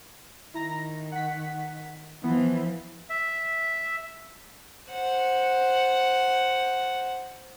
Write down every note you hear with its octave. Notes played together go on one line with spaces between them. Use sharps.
D#3 E4 A#5 A#6
F#5 B6
E3 F3 B3
E5
C5 F#5